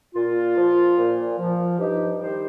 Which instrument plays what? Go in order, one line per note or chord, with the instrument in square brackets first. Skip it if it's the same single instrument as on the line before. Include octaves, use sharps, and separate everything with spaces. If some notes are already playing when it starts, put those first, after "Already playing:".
[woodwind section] A#2 F4
F3
A#2
F3
G2 D#4 G4
D#3 G3 G4 C5